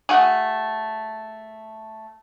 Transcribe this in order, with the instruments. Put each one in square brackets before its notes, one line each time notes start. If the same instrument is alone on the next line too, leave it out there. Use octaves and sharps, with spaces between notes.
[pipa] A3 F#4 G#4